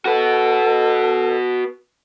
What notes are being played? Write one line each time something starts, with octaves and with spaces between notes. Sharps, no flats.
F#4 A4 B4